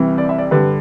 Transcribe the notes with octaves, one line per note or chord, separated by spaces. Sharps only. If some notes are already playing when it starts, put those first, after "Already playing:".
Already playing: C2 C3 E3
D5
E5
D5
G2 D3 G3 B4